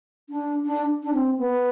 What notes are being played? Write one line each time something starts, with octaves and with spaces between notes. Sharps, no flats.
D4
D4
D4
C4
B3